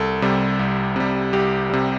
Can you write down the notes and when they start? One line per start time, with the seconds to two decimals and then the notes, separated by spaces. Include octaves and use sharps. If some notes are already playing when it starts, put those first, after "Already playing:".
Already playing: C2 A4
0.22 C3 G3
0.59 C2
0.96 C3 G3
1.33 C2 G4
1.70 C3 G3